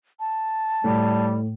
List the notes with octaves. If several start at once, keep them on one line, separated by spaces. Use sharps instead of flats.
A5
A2 G3